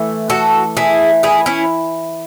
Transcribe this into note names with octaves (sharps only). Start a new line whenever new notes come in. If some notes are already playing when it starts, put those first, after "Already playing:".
Already playing: E3 A3
F#4 A4
E4 G#4
E4 G#4
C#4 E4